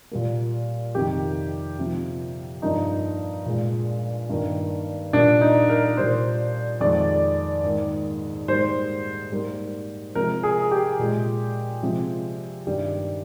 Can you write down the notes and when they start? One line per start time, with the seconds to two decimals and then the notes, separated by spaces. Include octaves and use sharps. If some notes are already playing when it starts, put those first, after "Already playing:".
0.11 A#2 G3 A#3
0.95 F2 C3 D#3 G4
1.79 C3 F3 A#3
2.62 G2 F3 A#3 D#4
3.46 A#2 G#3
4.30 G2 D#3 A#3
5.13 A#2 G3 A#3 D4
5.41 D#4
5.69 A#4
5.97 A#2 G3 A#3 C5
6.81 F2 D#3 G#3 D5
7.64 G#2 D#3 A#3
8.48 G#2 G3 A#3 C5
9.32 G#2 G3 A#3
10.15 C3 F3 G#3 A#4
10.43 G#4
10.71 G4
10.99 A#2 G#3
11.83 C3 F3 G#3
12.67 G2 D#3 G3